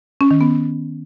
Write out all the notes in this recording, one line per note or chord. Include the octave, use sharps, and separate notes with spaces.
C#4
D#3
B3